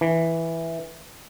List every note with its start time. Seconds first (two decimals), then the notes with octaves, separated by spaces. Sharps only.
0.01 E3